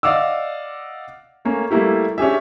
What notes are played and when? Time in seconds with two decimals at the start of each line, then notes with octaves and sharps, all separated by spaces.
0.03 D5 D#5 F5 F#5 D6 E6
1.45 A3 A#3 C#4
1.70 G3 A3 A#3 E4 G4
2.18 C#4 D4 G4 G#4 E5